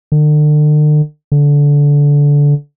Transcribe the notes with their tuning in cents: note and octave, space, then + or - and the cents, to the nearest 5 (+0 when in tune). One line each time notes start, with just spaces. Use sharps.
D3 +40
D3 -20